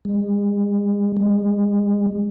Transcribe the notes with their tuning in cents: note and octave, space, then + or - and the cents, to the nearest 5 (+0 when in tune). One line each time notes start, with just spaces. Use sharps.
G#3 -40
G#3 -35